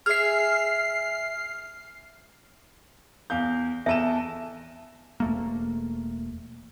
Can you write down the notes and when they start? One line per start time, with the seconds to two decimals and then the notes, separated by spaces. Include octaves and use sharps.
0.06 G#4 E5 F6 C7
3.30 E2 F5 G6
3.86 E2 A4 E5 A5 E7
5.20 E1 A3 A#3